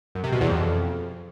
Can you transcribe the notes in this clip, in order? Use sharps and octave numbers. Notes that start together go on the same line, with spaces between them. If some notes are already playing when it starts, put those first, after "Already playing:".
F#2
C3
B2
E2
F2